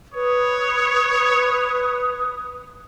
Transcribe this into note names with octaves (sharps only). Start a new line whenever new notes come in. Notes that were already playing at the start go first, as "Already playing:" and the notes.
B4 C#5 D#6